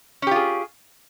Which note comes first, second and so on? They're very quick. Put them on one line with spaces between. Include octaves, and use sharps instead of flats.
C#4 G4 F4 G#4